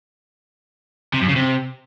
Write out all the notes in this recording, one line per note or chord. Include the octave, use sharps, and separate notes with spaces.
C3
F#2
C#3
C3